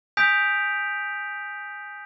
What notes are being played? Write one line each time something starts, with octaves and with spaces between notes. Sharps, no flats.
G#5 D#6 G6 B6 D7 F7